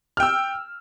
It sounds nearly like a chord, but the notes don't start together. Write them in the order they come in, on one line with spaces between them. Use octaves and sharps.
F6 G5 E6